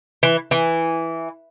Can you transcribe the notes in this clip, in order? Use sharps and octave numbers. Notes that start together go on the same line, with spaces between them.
E3
E3